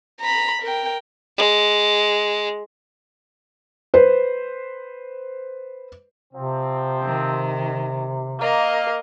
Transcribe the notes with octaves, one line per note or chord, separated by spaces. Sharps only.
A#5 B5
A#4 G5
G#3
B4 C5
C3 F3 C4
D#3
A#3 A#4 D#5 F5